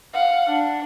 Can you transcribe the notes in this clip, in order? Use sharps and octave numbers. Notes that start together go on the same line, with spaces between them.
F5 F#5
D4